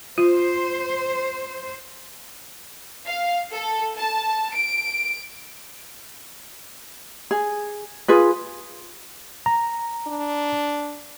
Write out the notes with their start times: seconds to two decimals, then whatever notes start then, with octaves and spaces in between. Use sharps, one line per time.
0.18 F4 C5
3.07 F5
3.52 A4
3.96 A5
4.53 D7
7.31 G#4
8.08 F4 G#4 B4
9.46 A#5
10.07 D4